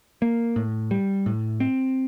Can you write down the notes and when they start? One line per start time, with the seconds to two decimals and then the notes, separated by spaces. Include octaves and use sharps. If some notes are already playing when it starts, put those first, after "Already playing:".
0.22 A#3
0.56 A2
0.91 G3
1.26 A2
1.60 C4